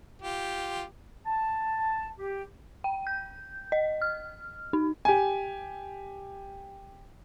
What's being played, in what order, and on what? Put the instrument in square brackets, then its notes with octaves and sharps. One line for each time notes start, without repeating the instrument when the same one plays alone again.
[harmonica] F4 G4
[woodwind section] A5
G4
[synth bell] G5
G6
D#5
F6
D#4
[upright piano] G4 G#5